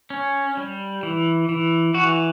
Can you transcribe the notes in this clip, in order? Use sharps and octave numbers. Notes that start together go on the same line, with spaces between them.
C#4
G3
E3
E3
E3 F#4